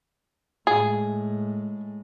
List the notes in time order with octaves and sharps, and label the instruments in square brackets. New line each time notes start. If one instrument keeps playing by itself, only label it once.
[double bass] A2 G#3 [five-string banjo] G#4